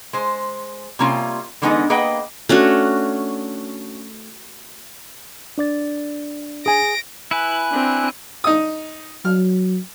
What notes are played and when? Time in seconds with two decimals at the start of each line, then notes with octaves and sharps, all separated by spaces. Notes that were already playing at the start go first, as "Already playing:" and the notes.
0.13 G#3 C5
0.99 C3 G3 A#3 C#4 F4 F5
1.62 D3 E3 G#3 B3 C4 D#4
1.90 A#3 G#4 B4 D#5 F#5 G5
2.49 A3 C#4 D4 F#4
5.58 D4 D5 A6
6.66 G#4 G#5 A#6 D7
7.31 E4 B4 G#5 F#6
7.72 C4 D4
8.44 D#4 D#6
9.25 F#3 F6